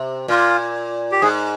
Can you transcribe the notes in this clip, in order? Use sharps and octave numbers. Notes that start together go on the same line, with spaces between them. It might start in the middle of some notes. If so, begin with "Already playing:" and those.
Already playing: C3
A#2 F4
G4
G#2 G#4